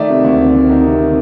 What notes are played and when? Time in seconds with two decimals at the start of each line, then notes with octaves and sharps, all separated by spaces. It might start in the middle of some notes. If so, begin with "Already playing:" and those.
Already playing: D#3 A3 D5 E5
0.09 C3
0.24 D2
0.39 C3
0.54 D2
0.70 D#3
0.85 C3
1.00 C3